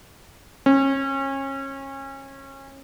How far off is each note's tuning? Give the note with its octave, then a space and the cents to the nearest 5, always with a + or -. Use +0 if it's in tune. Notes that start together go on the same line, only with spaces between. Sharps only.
C#4 -30